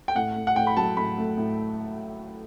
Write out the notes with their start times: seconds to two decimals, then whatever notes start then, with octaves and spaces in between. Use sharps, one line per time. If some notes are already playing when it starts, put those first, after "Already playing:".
0.08 G5
0.15 A2 F#5
0.36 A3
0.47 F#5
0.56 A2 G5
0.67 B5
0.77 F#3 A5
0.97 A2 B5
1.17 A3
1.37 A2